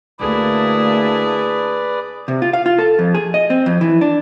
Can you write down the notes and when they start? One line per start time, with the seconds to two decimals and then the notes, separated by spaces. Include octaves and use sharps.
0.20 D2 A#3 D4 E4 G#4 B4 D5 A5
2.28 C3
2.42 F4
2.53 F5
2.66 F4
2.78 A4
2.99 F2
3.15 G#4
3.34 D#5
3.50 C4
3.66 F2
3.81 E3
4.01 D4